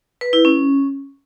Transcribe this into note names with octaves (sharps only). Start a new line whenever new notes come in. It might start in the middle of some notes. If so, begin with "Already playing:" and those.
B4
E4
C#4